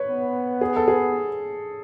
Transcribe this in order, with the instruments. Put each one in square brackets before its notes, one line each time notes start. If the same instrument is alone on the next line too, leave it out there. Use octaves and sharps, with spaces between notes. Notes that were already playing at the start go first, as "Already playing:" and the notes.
Already playing: [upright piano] B4 C#5
[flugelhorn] B3
[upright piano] G#4
A4
G#4